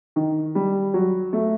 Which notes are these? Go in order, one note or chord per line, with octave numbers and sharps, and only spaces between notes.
D#3
G3
F#3
A3